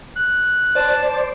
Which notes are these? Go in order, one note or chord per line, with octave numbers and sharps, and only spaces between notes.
F#6
C5 D5 A5